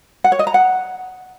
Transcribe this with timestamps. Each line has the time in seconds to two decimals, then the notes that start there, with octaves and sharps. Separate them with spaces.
0.24 F#5
0.32 C#5
0.39 D#5
0.47 A#5
0.54 F#5